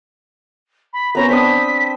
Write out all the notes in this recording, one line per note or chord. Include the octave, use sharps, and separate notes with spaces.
B5
B3 C#4 C5 A#5
C4 D4 D#6 B6